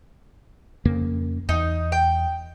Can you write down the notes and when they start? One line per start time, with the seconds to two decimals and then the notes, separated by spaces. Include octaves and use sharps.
0.85 F2 C#3 A#3
1.49 E2 D#4
1.92 G5